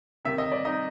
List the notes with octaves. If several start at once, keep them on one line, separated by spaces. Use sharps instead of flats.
C3 D#3 E5
D#5
D5
D#4 D#5